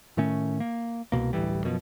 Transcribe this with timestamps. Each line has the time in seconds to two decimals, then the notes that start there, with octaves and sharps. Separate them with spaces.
0.17 A2 D#3 A3 C#4
0.60 A#3
1.12 C2 F2 B2 A#3
1.33 D1 A1 E3 G3
1.64 F#2 B2 E3 F3